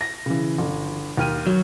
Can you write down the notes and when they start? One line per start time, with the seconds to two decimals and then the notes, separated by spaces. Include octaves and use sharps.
0.01 A#6
0.26 C#3 E3
0.58 G1
1.17 D#2 F6 D#7
1.47 F#3